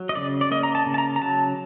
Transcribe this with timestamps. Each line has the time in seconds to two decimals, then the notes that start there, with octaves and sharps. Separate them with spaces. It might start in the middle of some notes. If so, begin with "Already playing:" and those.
Already playing: F#3
0.09 D#5
0.15 C#3 D5
0.41 D5
0.51 A#3 D#5
0.63 A#5
0.75 A5
0.86 C#3
0.94 A5
0.98 A#5
1.16 A#5
1.22 F#3 A5